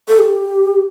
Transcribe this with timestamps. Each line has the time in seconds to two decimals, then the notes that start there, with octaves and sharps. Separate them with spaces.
0.08 A4
0.19 G4